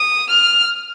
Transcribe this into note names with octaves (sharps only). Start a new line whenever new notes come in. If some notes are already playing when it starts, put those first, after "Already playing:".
Already playing: D#6
F6